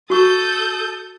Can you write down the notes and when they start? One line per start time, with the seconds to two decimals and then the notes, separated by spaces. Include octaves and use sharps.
0.10 F#4 A4 C#6 D#6 G6